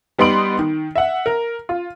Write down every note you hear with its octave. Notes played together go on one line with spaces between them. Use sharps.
G3 B3 D#4 C6 D7 F#7
D#3
E5 F#5
A#4
F4